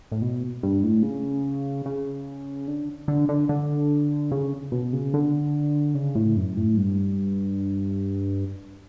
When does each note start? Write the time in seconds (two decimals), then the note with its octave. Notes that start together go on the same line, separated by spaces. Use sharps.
0.12 A2
0.22 B2
0.63 G2
0.83 A2
1.03 C#3
1.86 C#3
2.68 D3
3.08 D3
3.29 D3
3.49 D3
4.32 C#3
4.72 B2
4.93 C#3
5.14 D3
5.95 C#3
6.15 A2
6.37 F#2
6.57 A2
6.77 G2